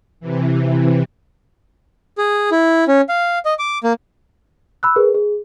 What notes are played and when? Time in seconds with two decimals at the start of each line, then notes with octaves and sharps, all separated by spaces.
0.20 C3 E3
2.18 G#4
2.52 E4
2.88 C#4
3.09 F5
3.45 D#5
3.59 D6
3.84 A#3
4.83 B5 E6 F#6
4.96 G#4 A#4 B4
5.14 G#4